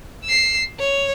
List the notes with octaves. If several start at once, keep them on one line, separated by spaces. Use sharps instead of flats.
E6 C7
C#5